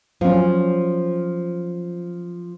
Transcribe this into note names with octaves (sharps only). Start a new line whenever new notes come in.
F3 F#3 C#4